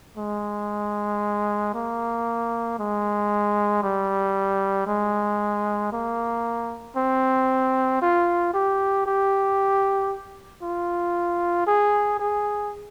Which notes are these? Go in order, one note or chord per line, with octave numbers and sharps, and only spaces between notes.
G#3
A#3
G#3
G3
G#3
A#3
C4
F4
G4
G4
F4
G#4
G#4